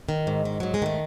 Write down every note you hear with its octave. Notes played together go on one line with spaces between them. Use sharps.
D#3
G#2
D#3
G#2 F#3
G#3
D#3 A3